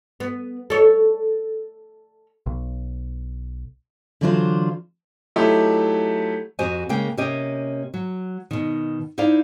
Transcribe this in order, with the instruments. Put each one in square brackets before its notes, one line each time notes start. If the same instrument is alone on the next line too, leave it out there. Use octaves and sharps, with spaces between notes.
[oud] B3
A4 C#5
[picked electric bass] B1
[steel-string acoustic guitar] D3 E3 F#3 D4 F4 C5
[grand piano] F#3 A3 D#4 E4 G4
[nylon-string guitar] F2 F#4 G4 C5 D#5 G#5
C#3 G#3 A#3 G5
C3 A#3 C#4 G4 D#5 G5
F#3
B2 D#3
D#4 E4 C5 D5 F5